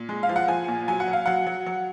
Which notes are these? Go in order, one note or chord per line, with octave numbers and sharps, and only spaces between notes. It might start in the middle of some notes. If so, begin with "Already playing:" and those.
Already playing: A#2
G#3
F5
F3
F#5
F3 G#5
A#2
F#3 G#5
F#5
F#3
F5
F#3 F#5
F#3
F#3